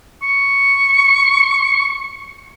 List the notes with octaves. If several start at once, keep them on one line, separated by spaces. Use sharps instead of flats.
C#6